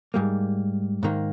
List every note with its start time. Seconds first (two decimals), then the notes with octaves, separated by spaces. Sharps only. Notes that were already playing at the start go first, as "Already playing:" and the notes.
0.14 G#2 G3 A#3
1.03 G#2 D#3 A#3